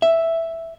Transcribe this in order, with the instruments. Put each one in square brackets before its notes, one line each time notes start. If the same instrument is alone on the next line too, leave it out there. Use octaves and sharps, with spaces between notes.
[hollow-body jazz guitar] E5